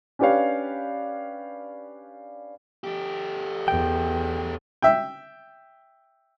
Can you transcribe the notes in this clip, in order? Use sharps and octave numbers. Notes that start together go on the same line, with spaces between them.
C#4 D4 G4 B4 C#5 F5
A3 G4
E2 G5
E5 G5